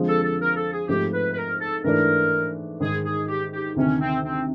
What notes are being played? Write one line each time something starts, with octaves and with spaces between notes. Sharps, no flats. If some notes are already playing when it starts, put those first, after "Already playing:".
Already playing: F2 D3 F3 G#3
A4
A4
A#4
A4
G#4
G#2 F3 A3 C4 D#4 G4
B4
B4
A#4
A4
G#2 E3 A3 D4 A#4
G#2 D#3 G#3 G#4
G#4
G4
G4
D2 C3 D#3 C#4
C4
C4